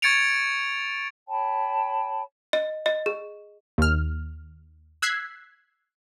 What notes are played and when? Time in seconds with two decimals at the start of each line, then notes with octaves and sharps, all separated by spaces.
0.02 C#6 G#6 A6 C#7 D7 F7
1.28 C#5 G5 A5 B5
2.53 D#5
2.86 D#5
3.06 G#4
3.78 D#2 F6
5.02 E6 F#6 G#6 B6 C7